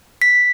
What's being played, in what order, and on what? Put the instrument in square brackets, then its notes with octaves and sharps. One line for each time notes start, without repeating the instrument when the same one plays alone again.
[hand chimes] B6